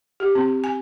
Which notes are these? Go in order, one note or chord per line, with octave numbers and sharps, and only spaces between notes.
G4
C4
G#5